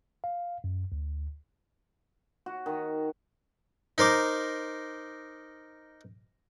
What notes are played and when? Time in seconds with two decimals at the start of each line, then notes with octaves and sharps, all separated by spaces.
0.24 F5
0.64 F#2
0.92 D2
2.46 F#4
2.66 D#3
3.98 D#4 A#4 C5 D6